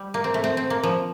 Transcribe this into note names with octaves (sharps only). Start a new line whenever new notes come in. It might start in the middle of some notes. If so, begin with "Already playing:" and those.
Already playing: G3
A#3
C4
A3
C4
C4
A#3
F3